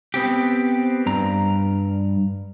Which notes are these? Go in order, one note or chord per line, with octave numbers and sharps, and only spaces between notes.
B3 C4 G4
G2 A#5